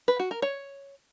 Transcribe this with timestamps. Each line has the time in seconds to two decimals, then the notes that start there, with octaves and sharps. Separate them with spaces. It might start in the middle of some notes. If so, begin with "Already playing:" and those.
0.08 B4
0.19 F#4
0.31 A#4
0.42 C#5